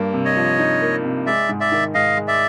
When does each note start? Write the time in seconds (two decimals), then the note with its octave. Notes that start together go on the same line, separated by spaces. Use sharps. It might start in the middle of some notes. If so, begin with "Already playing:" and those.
Already playing: G2 A#3
0.13 C3
0.25 C#5 D#5
0.36 F3
0.59 D#4
0.82 A#3
1.04 C3
1.26 G#3 D5 E5
1.49 G#2
1.60 D5 E5
1.72 D#3
1.94 G#2 D#5 F5
2.17 G#3
2.28 D5 E5